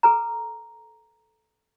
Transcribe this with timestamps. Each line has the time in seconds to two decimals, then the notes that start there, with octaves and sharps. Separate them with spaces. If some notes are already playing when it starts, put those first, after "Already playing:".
0.03 A4 B4 A#5